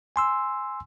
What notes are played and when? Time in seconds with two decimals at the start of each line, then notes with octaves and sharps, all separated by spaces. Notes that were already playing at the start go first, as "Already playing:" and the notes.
0.16 G#5 C6 E6